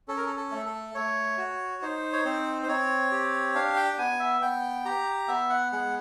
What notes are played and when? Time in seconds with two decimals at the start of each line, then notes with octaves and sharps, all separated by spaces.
0.08 C#4 A4
0.17 A#4
0.27 A4
0.37 A4
0.51 A3
0.66 A4
0.95 A3 C#5
1.38 F#4
1.82 D#4 C5
2.13 C#5
2.25 C4 C5
2.62 C5
2.68 C4 C#5
3.11 G4
3.55 D4 F5
3.77 G5
3.93 G5
3.98 B3 G#5
4.19 E5
4.41 B3 G5
4.85 G4 A#5
5.28 B3 E5
5.50 F#5
5.72 G#3 F#5